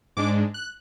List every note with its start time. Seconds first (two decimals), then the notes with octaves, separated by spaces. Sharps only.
0.17 G#2 G#3 D4 D6
0.54 F#6